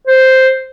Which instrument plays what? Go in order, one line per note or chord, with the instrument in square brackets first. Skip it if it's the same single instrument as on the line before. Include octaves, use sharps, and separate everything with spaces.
[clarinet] C5